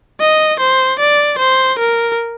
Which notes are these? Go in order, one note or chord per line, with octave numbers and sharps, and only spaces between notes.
D#5
C5
D5
C5
A#4